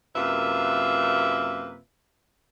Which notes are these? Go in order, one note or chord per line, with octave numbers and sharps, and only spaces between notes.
F#2 C3 A#3 F4 B4 E5